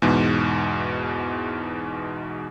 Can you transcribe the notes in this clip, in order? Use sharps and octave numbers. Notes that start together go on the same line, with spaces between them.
E2 G#2 B2